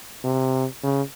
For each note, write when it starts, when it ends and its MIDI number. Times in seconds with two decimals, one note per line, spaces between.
0.24 0.66 48
0.84 1.03 49